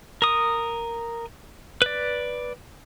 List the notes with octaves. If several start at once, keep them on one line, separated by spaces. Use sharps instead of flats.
A#4 D#6
B4 D5